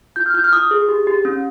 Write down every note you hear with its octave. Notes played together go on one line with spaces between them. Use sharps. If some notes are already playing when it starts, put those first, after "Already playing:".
F4 G6
F6
F4 G6
F6
F4 D#6
G#4
G4
G4
C#4